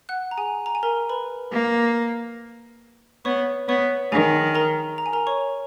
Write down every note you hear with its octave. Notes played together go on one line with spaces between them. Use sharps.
F#5 F#6
A#5
G#4 G#5
A#5
G#5
A#4 A#5
B4 B5
A#3
B3 C#5 C#6
B3 C#5 C#6
D#3 G#4 G#5
A#4 A#5
A#5
G#5
A#4 A#5
C#5 C#6